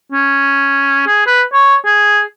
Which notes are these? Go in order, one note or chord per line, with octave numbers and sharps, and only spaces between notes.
C#4
G#4
B4
C#5
G#4